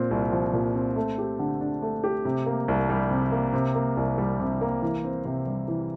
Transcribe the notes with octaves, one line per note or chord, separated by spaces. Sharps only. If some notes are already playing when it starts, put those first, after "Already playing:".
Already playing: A#2 C4
C2
F3
A#2
C4
A3
G4
D3
D4
A3
G4
C3
A#3
C2
G3
C3
A#3
C3
A#3
C2
G3
C3
A#3
E3
C4
C3
G3
E3